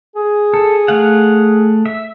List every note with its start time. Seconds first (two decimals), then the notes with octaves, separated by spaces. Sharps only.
0.16 G#4
0.54 A4
0.88 A3 F5 F#5
1.86 E5